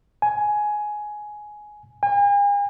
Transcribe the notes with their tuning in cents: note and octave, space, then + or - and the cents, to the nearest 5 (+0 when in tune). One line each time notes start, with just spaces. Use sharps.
G#5 +10
G#5 -45